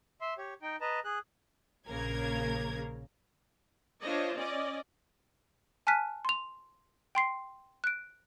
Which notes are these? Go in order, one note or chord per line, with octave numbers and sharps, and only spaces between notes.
E5 C6
G4 C#5
D#4 G5
B4 D#5 A5 A#5
G#4 F#6
A#1 C#3 A#3 A#4 G#6
D4 F4 C5 C#5 D#5
C#4 D5 D#5
G#5 A5 F6 F#6 B6 D#7
C6 F7
G5 C6 C7
F#6 D7